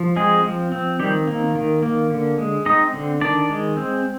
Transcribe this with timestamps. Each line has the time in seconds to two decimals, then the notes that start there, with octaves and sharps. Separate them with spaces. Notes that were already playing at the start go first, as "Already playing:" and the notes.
Already playing: F3
0.16 G#3 C4 G#4
0.44 F3
0.72 C4
0.99 D#3 G3 G4
1.27 A#3
1.55 D#3
1.83 A#3
2.11 D3
2.38 G#3
2.66 C4 D#4 D#5
2.94 D3
3.21 D#3 D4 D5
3.49 G#3
3.77 C4